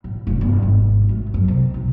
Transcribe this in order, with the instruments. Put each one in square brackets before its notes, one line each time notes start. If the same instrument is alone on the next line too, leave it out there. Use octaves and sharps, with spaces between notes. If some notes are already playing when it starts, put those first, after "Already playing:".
[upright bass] A1
F1
G1
G#1
A2
F#2
C3
B1